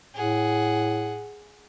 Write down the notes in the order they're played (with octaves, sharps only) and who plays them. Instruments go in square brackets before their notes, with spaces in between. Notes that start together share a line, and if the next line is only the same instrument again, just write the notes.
[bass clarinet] A2 [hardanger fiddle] G#4 F#5